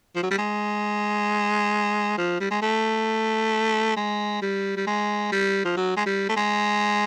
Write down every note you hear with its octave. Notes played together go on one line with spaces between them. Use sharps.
F3
F#3
G3
G#3
F3
G3
G#3
A3
G#3
G3
G3
G#3
G3
F3
F#3
G#3
G3
A3
G#3